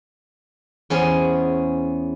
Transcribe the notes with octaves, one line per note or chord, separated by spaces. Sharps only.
E2 C#4 G#4 C5